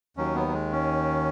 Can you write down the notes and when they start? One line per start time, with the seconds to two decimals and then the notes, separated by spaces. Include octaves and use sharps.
0.17 D#2 D#3 F#3 C#4
0.35 B3
0.48 F#3
0.53 G#3
0.72 C#4